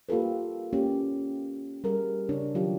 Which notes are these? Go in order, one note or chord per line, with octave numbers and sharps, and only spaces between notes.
A#3 F4 G4 A4 B4
A#3 C#4 G4
G3 G#4 A#4
C#3 D4 C#5
D#3 F#3 F4 G4